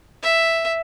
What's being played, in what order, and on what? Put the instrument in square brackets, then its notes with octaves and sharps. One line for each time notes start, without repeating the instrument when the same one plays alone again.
[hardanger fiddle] E5